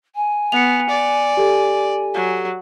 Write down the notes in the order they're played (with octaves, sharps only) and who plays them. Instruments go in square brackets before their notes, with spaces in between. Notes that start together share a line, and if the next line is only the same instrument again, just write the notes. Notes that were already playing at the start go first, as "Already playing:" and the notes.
[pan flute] G#5
[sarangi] B3 [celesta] C#7 F7
[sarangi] D5
[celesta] G4 A4
[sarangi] F#3